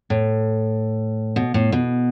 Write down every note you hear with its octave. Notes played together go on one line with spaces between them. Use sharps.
A2
B2
A2
B2